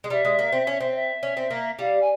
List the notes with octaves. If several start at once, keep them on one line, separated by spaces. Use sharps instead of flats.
G#3
G3 E5
G#3
A#3
C4
C#4
C4
C#5
E5
C#4
C4
A#3
G3 F5
G#5